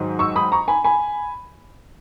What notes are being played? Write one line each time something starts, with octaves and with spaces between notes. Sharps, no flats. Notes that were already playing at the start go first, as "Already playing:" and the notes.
Already playing: G#2 D#3 F#3
C#6 E6
B5 D#6
A#5 C#6
G#5 B5
G#5 B5